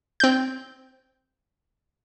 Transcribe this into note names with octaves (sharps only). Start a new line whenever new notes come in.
C4 G6